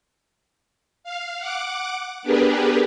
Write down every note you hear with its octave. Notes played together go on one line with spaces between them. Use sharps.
F5
F#5 D6
B3 D4 G4 G#4 A#4 B4